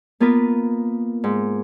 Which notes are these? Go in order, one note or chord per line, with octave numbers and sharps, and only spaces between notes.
A#3 B3 F4 A#4 B4
G#2